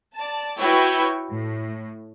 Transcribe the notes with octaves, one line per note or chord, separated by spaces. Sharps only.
D5 A5
E4 F#4 B4 C#5 G5 C#6
A2